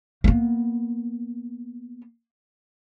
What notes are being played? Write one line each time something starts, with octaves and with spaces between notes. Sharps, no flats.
A#3 B3